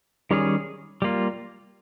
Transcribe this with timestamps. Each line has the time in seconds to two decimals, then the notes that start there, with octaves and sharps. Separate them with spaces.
0.31 D#3 G3 C#4 G#4
1.02 G3 A#3 F4